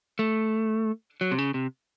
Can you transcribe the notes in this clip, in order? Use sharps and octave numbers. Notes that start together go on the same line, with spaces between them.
A3
F#3
C3
C#3
C3